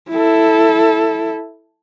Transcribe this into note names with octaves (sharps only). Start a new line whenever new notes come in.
E4 A4